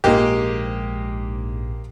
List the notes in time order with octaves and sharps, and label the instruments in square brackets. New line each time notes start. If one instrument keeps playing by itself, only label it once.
[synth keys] A#1 G#2 [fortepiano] G#3 A#3 G4